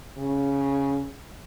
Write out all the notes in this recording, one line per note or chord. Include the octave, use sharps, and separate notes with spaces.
C#3